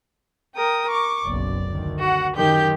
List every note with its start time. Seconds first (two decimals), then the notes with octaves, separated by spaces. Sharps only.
0.55 A#4 G5 D#6
0.90 C#6 D6
1.26 F#1 B1 D5
1.65 D2 D#3
1.99 F#4 F#5
2.36 F#2 D#3 G4 G6